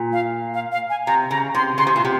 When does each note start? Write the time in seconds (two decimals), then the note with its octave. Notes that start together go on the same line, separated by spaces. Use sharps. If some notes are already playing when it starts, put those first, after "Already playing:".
Already playing: A#2
0.13 F5
0.54 F5
0.72 F5
0.90 G#5
1.07 C3 A#5
1.30 C#3 A#5
1.55 C3 C6
1.78 C#3 C6
1.87 C3
1.96 A#2 C6
2.05 C3